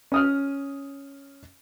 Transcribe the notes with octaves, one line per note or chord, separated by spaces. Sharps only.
C#4 D#6 F6